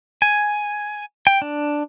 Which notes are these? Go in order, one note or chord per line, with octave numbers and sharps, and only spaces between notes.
G#5
G5
D4